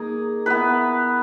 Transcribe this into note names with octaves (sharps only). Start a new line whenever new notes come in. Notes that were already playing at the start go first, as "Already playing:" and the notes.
Already playing: A#3 D#4 G#4
B3 E4 B4